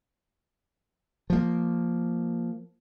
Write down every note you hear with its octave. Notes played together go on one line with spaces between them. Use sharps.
F3 A#3